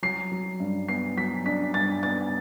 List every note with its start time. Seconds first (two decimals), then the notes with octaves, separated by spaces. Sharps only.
0.02 F#3 C7
0.32 F#3
0.60 G2
0.88 B3 C7
1.17 F#3 B6
1.46 D4 B6
1.74 G2 A6
2.03 B3 A6